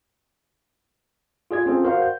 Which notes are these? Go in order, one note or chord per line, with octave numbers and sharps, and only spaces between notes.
F4 G#4 D5 G#6
C4 C#4 F4 G#4 A4 C5
F#4 A#4 C5 D5 F5 F#5
G6